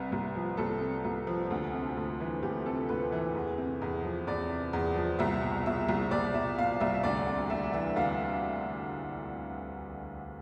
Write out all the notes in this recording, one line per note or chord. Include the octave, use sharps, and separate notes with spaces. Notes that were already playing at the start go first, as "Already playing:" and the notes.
Already playing: C2 C3 B4
C2
F3
C2 A4
C3
C2
F3
D2
C3
D2
E3
D2 G4
C3 A4
D2 B4
E3
E2
C3
E2
F3
E2 D5
C3
E2
F3
C2 E5
B2
B2 E5
C2
C2 D5
B2 E5
B2 F5
C2 E5
D2 D5
C3
D2 E5
E3 E5
D2 F5